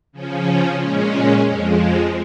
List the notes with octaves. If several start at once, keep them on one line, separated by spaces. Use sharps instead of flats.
C#3 F3 C#4
A#2 G#3 C#4
F2 F3 G#3